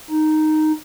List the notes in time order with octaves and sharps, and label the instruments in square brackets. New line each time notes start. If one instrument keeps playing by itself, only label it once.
[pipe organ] D#4